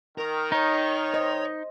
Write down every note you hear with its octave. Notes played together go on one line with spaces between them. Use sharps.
D#3 A#4
D#4 C#5
C5 D#5